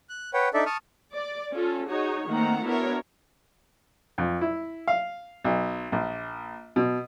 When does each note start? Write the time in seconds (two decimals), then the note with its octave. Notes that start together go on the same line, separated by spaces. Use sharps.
0.09 F#6
0.34 B4 C#5 F#5 G5
0.54 D4 D#4 A4 D5 E5
0.66 A5 C#6 D#6 F6
1.14 D5
1.54 C#4 F4 A4
1.90 D#4 F#4 G#4 C#5
2.30 D#3 A3 A#3 C4 F#5 A#5
2.65 B3 D4 E4 F#4 A#4 C#5
4.18 F2
4.41 E4
4.87 F5
5.44 B1
5.92 A#1
6.76 B2